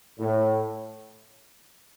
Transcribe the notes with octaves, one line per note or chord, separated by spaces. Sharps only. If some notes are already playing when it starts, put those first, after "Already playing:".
A2